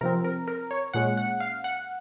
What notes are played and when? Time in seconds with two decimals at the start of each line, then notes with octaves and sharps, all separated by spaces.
0.01 C3 F3 C4 A#4
0.24 A#4
0.48 A#4
0.71 C#5
0.93 A#2 G#3 C#4 F#5
1.17 F#5
1.40 F5
1.64 F#5